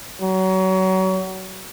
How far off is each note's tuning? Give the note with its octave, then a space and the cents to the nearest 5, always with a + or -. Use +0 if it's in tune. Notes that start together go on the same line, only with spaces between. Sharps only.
F#3 +30